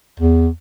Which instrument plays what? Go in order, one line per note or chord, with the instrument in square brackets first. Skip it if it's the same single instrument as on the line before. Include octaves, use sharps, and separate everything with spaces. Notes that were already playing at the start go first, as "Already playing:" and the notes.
[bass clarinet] E2